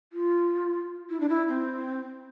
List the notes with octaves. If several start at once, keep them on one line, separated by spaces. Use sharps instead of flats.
F4
E4
D4
E4
C4